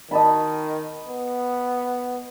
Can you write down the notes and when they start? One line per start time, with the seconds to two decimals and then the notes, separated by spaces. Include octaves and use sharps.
0.11 D#3 D#5 A5 B5
1.08 B3